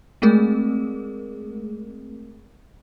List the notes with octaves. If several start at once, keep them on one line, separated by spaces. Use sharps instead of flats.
G#3 A3 C4 G#4 A#4